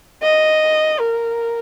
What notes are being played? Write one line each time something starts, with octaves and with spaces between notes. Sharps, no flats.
D#5
A#4